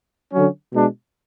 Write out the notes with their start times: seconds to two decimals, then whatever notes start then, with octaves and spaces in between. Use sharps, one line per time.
0.32 D3 F#3 C#4
0.72 B2 G#3 D4